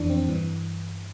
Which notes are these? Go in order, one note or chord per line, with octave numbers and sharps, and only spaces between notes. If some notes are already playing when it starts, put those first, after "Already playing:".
Already playing: F2 E3 D4
C4
G2 E3